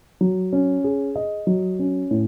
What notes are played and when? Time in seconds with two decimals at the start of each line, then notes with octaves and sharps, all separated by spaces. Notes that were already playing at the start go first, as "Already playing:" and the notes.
0.21 F#3
0.53 C#4
0.84 G#4
1.16 D#5
1.47 F#3
1.79 C#4
2.11 A2